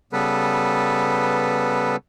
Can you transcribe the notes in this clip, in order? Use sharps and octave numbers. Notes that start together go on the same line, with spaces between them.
C#3 G3 B3 A4 B4